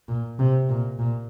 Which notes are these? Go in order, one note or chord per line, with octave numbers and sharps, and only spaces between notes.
A#2
C3
A#2
A#2